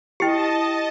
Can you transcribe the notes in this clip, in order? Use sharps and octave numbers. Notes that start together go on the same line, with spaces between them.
E4 G4 D#5 G5 A5 C#7